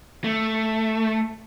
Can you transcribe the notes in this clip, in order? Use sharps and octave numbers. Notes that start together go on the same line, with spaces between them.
A3